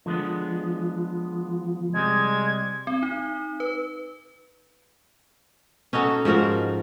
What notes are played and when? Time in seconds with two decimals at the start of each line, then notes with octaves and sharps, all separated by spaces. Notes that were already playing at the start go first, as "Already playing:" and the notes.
0.06 D3 F3 G#3 B3
1.94 C3 G3 G#3 G#6
2.87 C4
3.03 D#4
3.60 B4
5.93 C#4 D#4 F#4 A4
6.25 G#2 F3 F#4 A#4